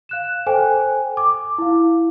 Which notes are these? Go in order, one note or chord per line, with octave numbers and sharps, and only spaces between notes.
F5 F#6 E7
A4 C5 G5 G#5
D6
E4 F5